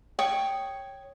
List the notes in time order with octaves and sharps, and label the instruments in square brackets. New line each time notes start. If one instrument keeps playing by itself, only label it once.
[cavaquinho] C#5 G5 C#6 D#6